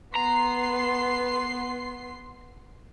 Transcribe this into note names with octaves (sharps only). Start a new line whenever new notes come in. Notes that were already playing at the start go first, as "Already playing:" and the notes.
B3 A#5 C6 C7